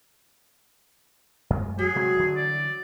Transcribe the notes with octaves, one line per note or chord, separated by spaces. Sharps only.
F#2 G#3 A3
F#3 G#4
C3 G#3 A3
D3 E3 G3
D5